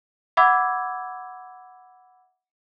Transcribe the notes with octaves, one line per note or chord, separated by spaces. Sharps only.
E5 F#5 B5 D6 E6 G#6